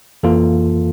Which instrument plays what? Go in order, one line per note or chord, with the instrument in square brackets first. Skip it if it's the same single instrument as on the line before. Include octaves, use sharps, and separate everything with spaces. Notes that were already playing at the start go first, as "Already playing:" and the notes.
[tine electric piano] F2 E3 A#3 F4 A4